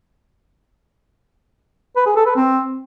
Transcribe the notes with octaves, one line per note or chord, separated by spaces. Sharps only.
B4
G#4
A4
B4
C4